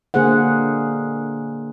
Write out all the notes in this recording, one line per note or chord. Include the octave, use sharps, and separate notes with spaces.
D3 A#3 G#4 C5 F#5